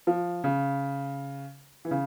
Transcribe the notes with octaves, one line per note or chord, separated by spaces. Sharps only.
F3
C#3
E3
C#3